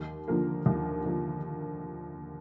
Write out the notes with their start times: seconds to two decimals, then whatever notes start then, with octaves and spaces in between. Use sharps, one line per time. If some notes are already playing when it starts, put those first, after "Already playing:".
Already playing: D#2
0.28 D3 F3 A#3
0.66 D#2
1.05 D3 F3 A#3